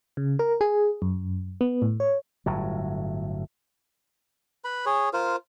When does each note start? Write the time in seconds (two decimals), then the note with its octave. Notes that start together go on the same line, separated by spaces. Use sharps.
0.17 C#3
0.39 A#4
0.61 G#4
1.02 F#2
1.61 B3
1.82 A2
2.00 C#5
2.46 G1 A2 F#3
4.64 B4 B5
4.86 G#4 C#5
5.13 F4 A#4 C5